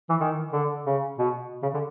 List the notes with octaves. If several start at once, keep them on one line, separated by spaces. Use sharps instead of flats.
E3
D#3
D3
C#3
B2
C#3
D3